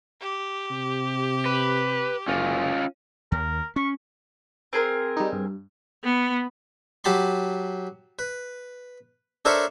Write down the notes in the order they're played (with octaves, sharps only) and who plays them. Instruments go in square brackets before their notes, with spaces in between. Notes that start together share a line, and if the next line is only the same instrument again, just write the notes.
[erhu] G4
[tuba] C3
[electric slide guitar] B4
[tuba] F#1 [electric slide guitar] C#4 F4
[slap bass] D#2 [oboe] A#4
[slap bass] C#4 [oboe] C#6
[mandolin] C4 G#4 A#4
[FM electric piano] G3 D#4
G2
[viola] B3
[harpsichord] F#3 G4 A5 B5 C6
B4
D4 A4 A#4 C5 C#5 E5